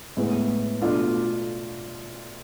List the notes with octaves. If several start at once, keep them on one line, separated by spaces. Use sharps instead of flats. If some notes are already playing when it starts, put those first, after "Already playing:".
A2 G#3 B3
B2 A3 D4 F4